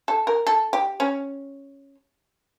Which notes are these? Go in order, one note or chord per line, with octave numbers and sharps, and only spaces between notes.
A4
A#4
A4
G4
C#4